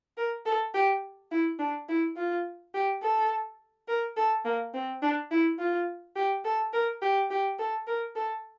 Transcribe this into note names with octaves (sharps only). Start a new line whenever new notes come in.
A#4
A4
G4
E4
D4
E4
F4
G4
A4
A#4
A4
A#3
C4
D4
E4
F4
G4
A4
A#4
G4
G4
A4
A#4
A4